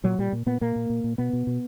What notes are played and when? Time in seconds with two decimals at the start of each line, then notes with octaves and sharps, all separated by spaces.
0.04 A#2 F#3
0.19 A#2 G3
0.33 A#2
0.46 A#2 B3
0.61 A#2 A#3
0.76 A#2
0.90 A#2
1.04 A#2
1.18 B2 B3
1.33 B2
1.47 B2